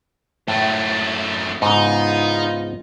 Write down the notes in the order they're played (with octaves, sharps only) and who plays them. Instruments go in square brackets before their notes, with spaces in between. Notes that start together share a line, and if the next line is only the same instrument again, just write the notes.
[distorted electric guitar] F#2 A3 [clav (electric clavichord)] A2
[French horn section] E2 B3 F4 [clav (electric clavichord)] G#2 C#3 [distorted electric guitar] D#4